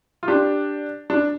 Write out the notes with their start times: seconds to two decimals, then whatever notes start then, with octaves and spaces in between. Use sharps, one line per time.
0.23 F4
0.28 D4 G4
1.10 D4